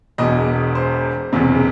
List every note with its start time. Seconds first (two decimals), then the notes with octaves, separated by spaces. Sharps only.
0.18 E1 E2 B2 D#5
0.75 C5
1.33 E1 E2 C3